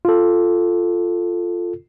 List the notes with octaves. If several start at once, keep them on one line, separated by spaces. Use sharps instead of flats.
F4 A4